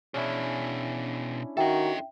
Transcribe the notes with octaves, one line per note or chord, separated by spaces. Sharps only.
B2 C#4 D4 E4 G#4
D#3 F#4 A4 D#5 E5 G5